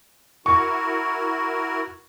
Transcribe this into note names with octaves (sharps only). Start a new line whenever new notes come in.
E4 F#4 A#4 C#6